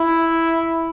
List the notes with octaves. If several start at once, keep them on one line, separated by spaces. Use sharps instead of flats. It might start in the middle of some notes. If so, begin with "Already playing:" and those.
Already playing: E4